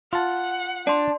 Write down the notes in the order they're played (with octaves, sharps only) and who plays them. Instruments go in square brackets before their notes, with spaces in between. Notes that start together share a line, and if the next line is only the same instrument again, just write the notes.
[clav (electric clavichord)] F4 A5 [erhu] F#5
[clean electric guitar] D4 [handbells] D5 C6